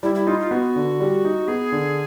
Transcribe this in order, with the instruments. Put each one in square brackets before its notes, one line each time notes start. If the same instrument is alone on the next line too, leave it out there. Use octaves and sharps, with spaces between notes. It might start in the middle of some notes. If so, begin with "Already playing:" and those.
[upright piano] G3 [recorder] E4
[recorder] E4
[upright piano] D#4 [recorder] F4
[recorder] F4
[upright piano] B3 [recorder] F#4
[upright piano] D3
G3
D#4
[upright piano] B3 [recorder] G#4
[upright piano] D3